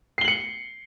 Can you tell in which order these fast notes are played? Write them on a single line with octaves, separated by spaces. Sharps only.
C7 G7 F#7 C#7